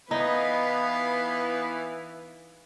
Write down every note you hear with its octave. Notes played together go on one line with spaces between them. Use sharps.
E3 B3 D#4 B4 F5